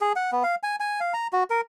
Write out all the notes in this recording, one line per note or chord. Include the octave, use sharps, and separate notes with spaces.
G#4
F#5
B3
F5
G#5
G#5
F5
A#5
F#4
A#4